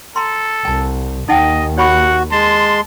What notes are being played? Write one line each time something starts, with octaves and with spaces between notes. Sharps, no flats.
A4 A#5 C6
C2 G#5 A5
D#2 D#4 D#5 F#5 G5
F#4 C#5 F#5 B5 C#6
G#3 A5 C6